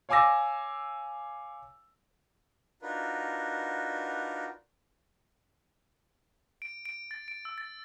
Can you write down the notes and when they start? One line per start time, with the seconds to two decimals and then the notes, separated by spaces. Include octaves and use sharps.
0.09 C#5 F5 G#5 D6 E6 A#6
2.82 D4 D#4 F4 F#4 A#4 B4
6.62 D7
6.86 D7
7.11 A6
7.28 D7
7.45 E6
7.58 A6